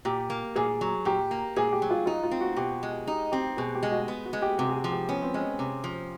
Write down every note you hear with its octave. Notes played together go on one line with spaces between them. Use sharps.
A#2 G4
A#3
A#2 G#4
F#3
A#2 G4
A#3
A#2 G#4
G4
F#3
F4
D#4 F4
F4
C4
F#4
B2 G4
G#3
D#4 G4
C4 G4
B2 G#4
G4
G#3
F#4
B3
F#4
G#3
G4
C3 F#4
G#4
G4
F3
G4
B3 C#4
C4
G#3 C#4
C3
F3